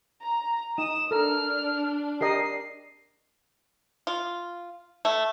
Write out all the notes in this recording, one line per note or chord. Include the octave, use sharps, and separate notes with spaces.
A#5
D#4 D#6 E7
D4 A4 A#4 F6
G4 A#4 D#5 C7
F4
A3